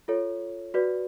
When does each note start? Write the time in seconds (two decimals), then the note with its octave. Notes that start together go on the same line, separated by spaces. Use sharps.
0.08 F4 A4 C#5
0.74 F#4 B4 D5